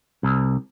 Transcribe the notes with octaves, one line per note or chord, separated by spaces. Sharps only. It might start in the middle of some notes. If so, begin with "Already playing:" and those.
C2